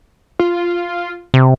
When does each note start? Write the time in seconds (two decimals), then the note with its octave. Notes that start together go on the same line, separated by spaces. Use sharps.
0.39 F4
1.34 C3